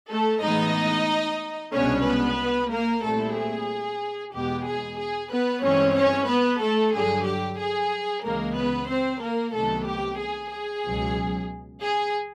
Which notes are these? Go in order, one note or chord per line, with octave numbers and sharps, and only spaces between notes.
A3 A4
A2 E3 G#3 B3 D#4 D#5
C2 B2 G#3 B3 C#4 D4 C#5
B3 B4
A#3 A#4
A#2 G3 A3 C4 E4 A4
G#4
E2 B2 G#3 B3 G4
G#4
G#4
B3 B4
G2 E3 G#3 C4 C#4 C#5
C#4 C#5
B3 B4
A3 A4
G2 D3 F#3 G#4
G4
G#4
C#2 C#3 E3 G#3 A#3 A#4
B3 B4
C4 C5
A#3 A#4
C2 C3 D#3 F#3 A3 B3 A4
G4
G#4
G#4
C#2 B2 F#3
G#4